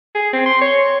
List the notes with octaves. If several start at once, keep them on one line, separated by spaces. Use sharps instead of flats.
G#4
C4
C6
C#5